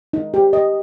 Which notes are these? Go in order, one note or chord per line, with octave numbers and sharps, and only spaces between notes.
D#4
G4
D#5